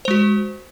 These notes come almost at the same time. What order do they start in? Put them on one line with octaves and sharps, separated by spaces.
C5 G#3 F#4